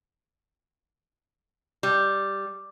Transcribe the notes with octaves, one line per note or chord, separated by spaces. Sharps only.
G3